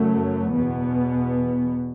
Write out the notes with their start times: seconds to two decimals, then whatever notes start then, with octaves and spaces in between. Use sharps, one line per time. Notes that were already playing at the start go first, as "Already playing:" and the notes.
Already playing: F#1 F#2 F#3 A3
0.54 E2 B2 B3